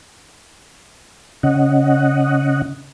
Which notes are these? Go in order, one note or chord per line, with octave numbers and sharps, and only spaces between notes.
C#3 C#4 D#5 F#5